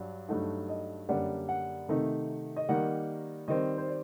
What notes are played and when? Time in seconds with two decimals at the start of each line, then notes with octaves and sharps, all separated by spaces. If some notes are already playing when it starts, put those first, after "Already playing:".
Already playing: G2 F#3 D4
0.29 G2 F#3 A3 D#4 F#5
0.69 D#5
1.09 F#2 D3 G3 A#3 D4 F#5
1.49 F#5
1.89 C3 D#3 A3 D#4
2.56 D#5
2.68 D#3 G3 A#3 D#4 F#5
3.48 D#3 G3 C4 D#5
3.78 C5
3.88 D5